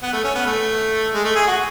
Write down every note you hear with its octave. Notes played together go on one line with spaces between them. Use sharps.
B3
A3
C#4
B3
A3
G#3
A3
G#4
F#4